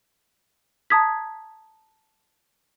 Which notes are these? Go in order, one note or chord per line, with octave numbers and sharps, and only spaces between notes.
A5 A#5 D#6 G#6 B6